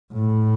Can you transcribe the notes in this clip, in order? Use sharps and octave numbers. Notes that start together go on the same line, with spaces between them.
A2